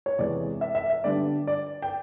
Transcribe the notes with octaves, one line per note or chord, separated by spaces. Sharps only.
C#5
E2 C3 E3 G#3 B3 D5
E5
E5
E5
D3 G3 B3 D4 D5
D5
G5